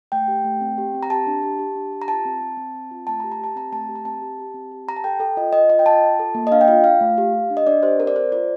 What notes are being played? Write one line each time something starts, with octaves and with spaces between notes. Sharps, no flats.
A3 G5
G4
A3
C4
G4
C4
A#5
G4 A5
D4
G4
G4
D4
G4
A#5
F4 A5
C4
C4
C4
C4
F4
A3 A5
A#5
G4
A#5
G4 A5
C4 A#5
A3 A5
G4
A#5
C4 A5
G4
G4
C4
G4
G4 A#5
A5
A4 G5
A4 G5
F4 D#5
F4 D#5
F4 D#5
G5
F4 A5
F4
A4
A#3
D#5
D4 F5
G5
F4 F5
F4 F5
A3
G4
G4
D4
D#5
D4 D5
G4 C5
C4 A#4
D5
A4 C5
F4 D5